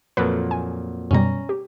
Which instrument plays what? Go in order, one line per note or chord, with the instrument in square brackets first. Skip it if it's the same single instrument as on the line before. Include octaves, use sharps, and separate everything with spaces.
[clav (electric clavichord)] F2 A#2 F#3 [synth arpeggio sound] A4 B4
[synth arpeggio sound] G#5
[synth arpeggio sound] F#2 B2 G3 [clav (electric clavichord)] C#4 A#5
[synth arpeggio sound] G4